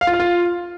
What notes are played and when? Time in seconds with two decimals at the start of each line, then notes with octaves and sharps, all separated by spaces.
0.01 F5
0.07 F4
0.13 F5
0.20 F4